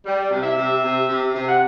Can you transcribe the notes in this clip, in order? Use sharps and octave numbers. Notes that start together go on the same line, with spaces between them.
G3
C3
E5
C3
C3
C3
C3
F#5